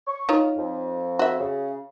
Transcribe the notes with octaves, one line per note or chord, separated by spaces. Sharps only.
C#6
D#4 F4 C#5
F2
F#4 E5
C#3